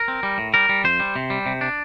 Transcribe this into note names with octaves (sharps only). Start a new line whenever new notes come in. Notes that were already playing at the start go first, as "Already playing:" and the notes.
Already playing: A#4
C4
G3
A2
G3 A#4
G3
F2 C5
G3
C3
G3
C3
D4